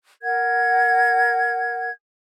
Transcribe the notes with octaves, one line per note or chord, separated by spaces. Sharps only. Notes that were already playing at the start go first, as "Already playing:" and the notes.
A#4 F#5 G#6